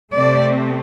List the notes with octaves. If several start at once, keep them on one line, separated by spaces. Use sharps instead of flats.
C3 A3 C4 D5